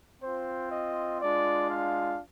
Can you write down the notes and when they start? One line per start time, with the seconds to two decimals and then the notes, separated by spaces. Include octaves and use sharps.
0.22 C4 F4 C5
0.72 D#5
1.21 G#3 D4 F4 D5
1.70 F5